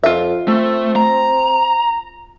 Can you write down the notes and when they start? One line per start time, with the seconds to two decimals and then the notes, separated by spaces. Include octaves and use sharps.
0.03 F2 F4 E5
0.48 A3 C4
0.96 A#5